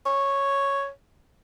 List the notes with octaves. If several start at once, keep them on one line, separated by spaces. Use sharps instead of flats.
C#5